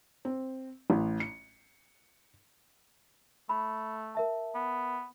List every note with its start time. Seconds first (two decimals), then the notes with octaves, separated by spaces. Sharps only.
0.25 C4
0.90 A1
1.20 C#7
3.49 A3 B5
4.15 A#4 E5 A5
4.55 B3